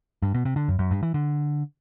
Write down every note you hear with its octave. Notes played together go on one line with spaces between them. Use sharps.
G2
B2
C3
D3
F#2
F#2
G2
E3
D3